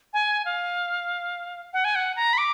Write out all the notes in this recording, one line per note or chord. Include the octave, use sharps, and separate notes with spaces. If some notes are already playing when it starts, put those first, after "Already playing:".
G#5
F5
F#5
G#5
F#5
A#5
B5
D6